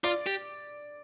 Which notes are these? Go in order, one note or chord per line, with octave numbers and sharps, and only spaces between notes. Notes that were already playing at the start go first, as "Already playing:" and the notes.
F4 D5
G4